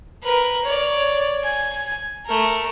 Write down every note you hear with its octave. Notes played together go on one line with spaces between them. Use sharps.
A#4 B4
C#5 D5
G#5
A3 A#4